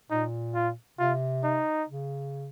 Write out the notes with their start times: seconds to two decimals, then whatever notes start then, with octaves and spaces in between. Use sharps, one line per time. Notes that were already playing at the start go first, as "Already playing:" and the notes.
0.10 A#2 D#4
0.55 F4
0.99 C3 F4
1.44 D#4
1.88 C#3